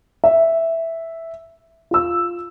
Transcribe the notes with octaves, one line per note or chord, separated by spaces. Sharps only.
E5
F4 E6